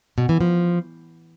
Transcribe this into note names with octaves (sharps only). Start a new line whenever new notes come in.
B2
E3
F3